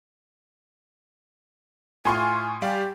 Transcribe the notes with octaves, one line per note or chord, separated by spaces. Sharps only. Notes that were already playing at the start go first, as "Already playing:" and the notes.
A2 F4 G#5 C6 C#6
G3 G4 D5 F5